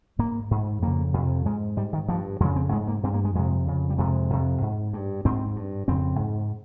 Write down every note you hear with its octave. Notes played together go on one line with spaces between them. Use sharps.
G#2 A#3
G#2
F2 C#3 A#3
F2 C3
G#2 G#3
G#2 G3
D#3
G2 F3
F2 C#3 G#3
C4
G#2 G#3
A#3
G2 C4
A#3
G#3
F2 C3 G#3
F2 C#3
G3
F2 C3 G#3
F2 C3
G#2
G2
G#2 C4
G2
F2 C#3 C4
G#2